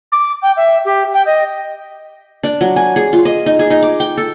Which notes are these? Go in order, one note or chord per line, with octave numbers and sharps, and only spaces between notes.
D6
G5
E5
G4
G5
D#5
D4
F#3
G#5
G#4
F4
D#5
D#4
G#4
D#4
D6
G5
A4